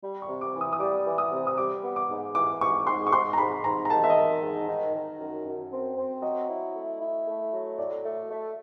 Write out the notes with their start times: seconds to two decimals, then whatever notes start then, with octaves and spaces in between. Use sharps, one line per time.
0.03 G3
0.22 C#6
0.28 C3
0.41 D6
0.54 E3
0.61 D#6
0.73 D#6
0.80 G3 D6
1.06 E3
1.18 D#6
1.32 C3
1.47 D#6
1.57 G3 D6
1.83 B3
1.96 D6
2.09 G#2
2.35 E3 D6
2.61 G#2 C#6
2.87 G#2 C6
3.07 C#6
3.13 G#2 C6
3.33 A#5
3.38 G#2 B5
3.64 G#2 A#5
3.85 A#5
3.90 D#3 A5
4.04 E5
4.10 D#5
4.16 D#3
4.42 G#2
4.68 D#3
4.93 D#3
5.19 F#2
5.45 F#2
5.71 C4
5.97 C4
6.22 F#3 D#5
6.48 E4
6.74 A3
7.00 E4
7.26 A3
7.52 F#3
7.78 A2 D5
8.04 A3
8.30 A3